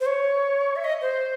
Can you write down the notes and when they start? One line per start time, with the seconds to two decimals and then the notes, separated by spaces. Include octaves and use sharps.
0.01 C5
0.06 C#5
0.76 E5
0.84 D#5
1.02 C5